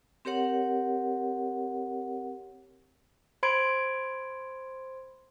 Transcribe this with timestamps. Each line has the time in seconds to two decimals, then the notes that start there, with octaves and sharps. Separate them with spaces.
0.25 C4 G4 A#4 C#5 F#5
3.43 C5 B5 C6 G#6 D7